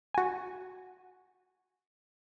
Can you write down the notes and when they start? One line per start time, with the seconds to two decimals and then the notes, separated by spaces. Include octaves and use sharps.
0.14 F#4 G#5